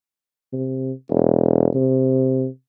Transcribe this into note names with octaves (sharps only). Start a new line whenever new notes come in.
C3
E1
C3